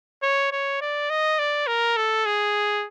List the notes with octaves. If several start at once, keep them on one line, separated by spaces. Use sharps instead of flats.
C#5
C#5
D5
D#5
D5
A#4
A4
G#4